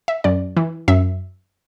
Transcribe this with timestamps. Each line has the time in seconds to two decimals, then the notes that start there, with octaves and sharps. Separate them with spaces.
0.08 E5
0.24 F#2 D5
0.57 E3
0.88 F#2 E5